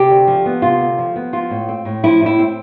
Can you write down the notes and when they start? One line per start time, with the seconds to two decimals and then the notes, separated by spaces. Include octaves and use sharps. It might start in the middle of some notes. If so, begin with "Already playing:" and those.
Already playing: C3 G4
0.10 D2
0.27 F3
0.46 B3
0.62 C3 F4
0.80 D2
0.98 F3
1.16 B3
1.33 F3 F4
1.50 A2
1.68 C4
1.85 A2
2.04 F3 E4
2.21 A2
2.26 E4
2.39 C4